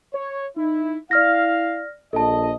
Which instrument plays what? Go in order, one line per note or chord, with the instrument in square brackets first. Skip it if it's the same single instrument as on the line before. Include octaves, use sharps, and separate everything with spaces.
[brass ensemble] C#5
D#4 E4
[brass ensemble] E4 F5 [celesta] D5 F6 A#6
[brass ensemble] A#1 D#5 [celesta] A4 A5